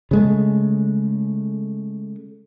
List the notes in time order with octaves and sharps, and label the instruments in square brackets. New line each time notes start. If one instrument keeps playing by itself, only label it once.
[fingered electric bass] C#3 G#3 A3